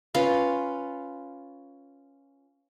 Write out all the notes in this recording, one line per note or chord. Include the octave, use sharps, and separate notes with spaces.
C#4 F4 B4 F5